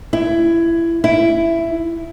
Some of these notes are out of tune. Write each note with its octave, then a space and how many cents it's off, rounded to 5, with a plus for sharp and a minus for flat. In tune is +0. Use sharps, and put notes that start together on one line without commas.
E4 +20
E4 +10